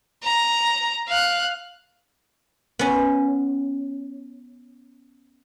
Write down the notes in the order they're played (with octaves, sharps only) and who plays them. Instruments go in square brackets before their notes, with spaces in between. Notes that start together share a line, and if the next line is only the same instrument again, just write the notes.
[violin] A#5
F5 F#6
[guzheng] B3 C#4